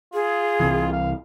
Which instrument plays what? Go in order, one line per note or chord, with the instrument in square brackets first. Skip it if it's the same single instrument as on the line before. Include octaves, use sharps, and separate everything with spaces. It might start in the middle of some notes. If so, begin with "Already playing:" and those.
[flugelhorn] F4 [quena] G#4
[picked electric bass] C2 C3 E3
[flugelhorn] F5